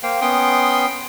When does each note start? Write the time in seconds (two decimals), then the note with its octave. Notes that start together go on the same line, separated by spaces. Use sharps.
0.03 A#3 C5 F5 G5
0.22 B3 C#4 G5 C6 D#6